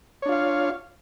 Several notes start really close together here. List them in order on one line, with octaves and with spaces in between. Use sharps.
C#5 D4 F4 F5